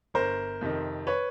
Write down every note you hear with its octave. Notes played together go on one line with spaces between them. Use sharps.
G1 A#4 C5
F2 C3 D#3
B4 C#5